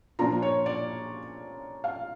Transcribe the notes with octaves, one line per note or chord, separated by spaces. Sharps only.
A#2 F3 A#3 D4 F4 A#5
C#5
D5
F5